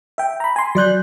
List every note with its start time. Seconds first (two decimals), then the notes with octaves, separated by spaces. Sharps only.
0.18 E5 G5
0.40 A#5 B5
0.56 G#5 C6
0.75 F#3 D5 F#6 G6